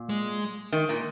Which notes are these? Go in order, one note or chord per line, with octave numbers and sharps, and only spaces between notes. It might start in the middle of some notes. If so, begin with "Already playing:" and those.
Already playing: A#2
G#3
D#3
A#2